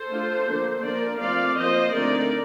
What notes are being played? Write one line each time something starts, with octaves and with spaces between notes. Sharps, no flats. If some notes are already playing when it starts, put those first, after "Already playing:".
Already playing: A4 C5
A3 D4 F4
D3 F3 A#3 D4
F3 A#3 D4 A#4 D5
F3 A3 C4 F4 D5 F5
F3 A#3 F4 C5 D#5
D3 A3 C4 D#4 A#4 D5